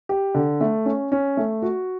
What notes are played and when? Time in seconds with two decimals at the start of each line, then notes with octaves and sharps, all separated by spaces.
0.09 G4
0.35 D3
0.61 A3
0.86 C#4
1.12 C#4
1.37 A3
1.62 F#4